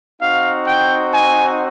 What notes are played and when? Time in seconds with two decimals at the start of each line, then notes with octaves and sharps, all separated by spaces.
0.21 C4 D#4 F#4 F5
0.66 G5
1.13 G#5